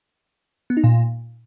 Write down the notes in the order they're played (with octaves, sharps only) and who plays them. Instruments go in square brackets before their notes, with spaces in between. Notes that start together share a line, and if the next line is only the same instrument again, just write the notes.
[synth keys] B3
D#4
A#2